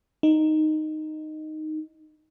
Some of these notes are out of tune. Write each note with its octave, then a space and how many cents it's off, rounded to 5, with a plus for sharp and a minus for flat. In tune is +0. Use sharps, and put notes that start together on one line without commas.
D#4 -5